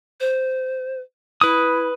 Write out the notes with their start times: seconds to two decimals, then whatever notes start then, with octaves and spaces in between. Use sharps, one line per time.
0.20 C5
1.41 E4 B4 D#6